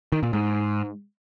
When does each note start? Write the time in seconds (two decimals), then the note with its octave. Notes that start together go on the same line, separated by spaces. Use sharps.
0.12 D#3
0.23 A#2
0.33 G#2